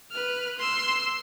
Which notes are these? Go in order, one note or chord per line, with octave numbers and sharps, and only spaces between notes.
B4 F6
C6 E6